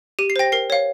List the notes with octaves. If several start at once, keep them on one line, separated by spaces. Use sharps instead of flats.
G4 D#7
C7
C5 G5 A#6
A#4 C7
C#5 F5